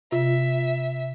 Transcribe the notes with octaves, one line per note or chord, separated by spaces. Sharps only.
C3 F4 E5